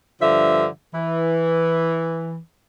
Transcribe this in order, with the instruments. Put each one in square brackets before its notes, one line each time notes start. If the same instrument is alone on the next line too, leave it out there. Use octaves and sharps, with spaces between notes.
[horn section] G2 D3 F3 E5
E3